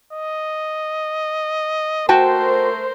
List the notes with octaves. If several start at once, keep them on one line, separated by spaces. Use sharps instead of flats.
D#5
A3 F#4 A#4 C5 G5 A5